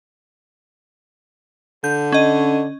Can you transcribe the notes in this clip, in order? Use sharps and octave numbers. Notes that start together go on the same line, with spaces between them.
D3 G6
C#4 D#5